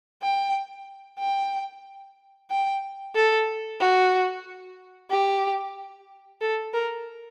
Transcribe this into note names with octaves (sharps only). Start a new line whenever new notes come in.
G5
G5
G5
A4
F#4
G4
A4
A#4